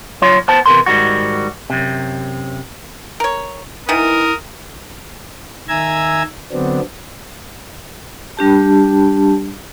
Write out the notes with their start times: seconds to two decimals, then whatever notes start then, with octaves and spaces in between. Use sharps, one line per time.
0.22 F#3 F4 C#5 C6
0.48 B3 C5 A5
0.66 E2 C3 A#4 B4 C6
0.86 G#2 D#3 G3 F#4
1.70 F#2 C3
3.20 A#4 C#5
3.89 D#3 E3 B3 E4 A#4 D#6
5.69 D#3 E5 G#5 A#5 E6 G#6
6.52 D3 F#3 B3 C4 D4
8.37 G3 D4 G4 A5